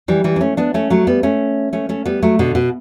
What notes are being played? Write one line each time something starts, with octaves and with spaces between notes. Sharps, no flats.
E3 G3
E3 G3
D4
A3 C#4
B3 D4
A3 C#4
F#3 A3
G3 B3
A3 C#4
A3 C#4
A3 C#4
G3 B3
F#3 A3
B2 D3
B2